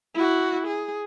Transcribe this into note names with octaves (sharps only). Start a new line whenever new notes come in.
E4 F#4
G#4